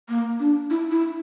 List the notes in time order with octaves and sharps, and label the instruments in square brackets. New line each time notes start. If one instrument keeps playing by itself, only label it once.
[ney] A#3
D4
E4
E4